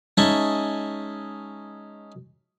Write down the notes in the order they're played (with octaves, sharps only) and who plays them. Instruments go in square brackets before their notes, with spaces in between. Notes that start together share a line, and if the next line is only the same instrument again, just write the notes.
[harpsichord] G#3 C#4 D#4 E5 A5 C#6